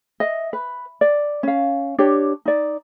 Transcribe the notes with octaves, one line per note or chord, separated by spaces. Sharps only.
D#5 E5
B4
D5
C#4 F5
D4 G4 C#5
D#4 D5